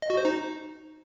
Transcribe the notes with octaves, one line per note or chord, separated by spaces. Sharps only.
D#5
F#4
C5
D#4